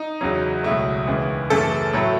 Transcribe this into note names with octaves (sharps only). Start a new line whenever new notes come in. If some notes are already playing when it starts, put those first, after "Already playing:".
Already playing: D#4
E2 C#3 F#3
C#2 B2 F#3 A3 E4
D#2 C#3 E3 G#3
F#2 C#3 E3 A3 A4
A2 F#3 A3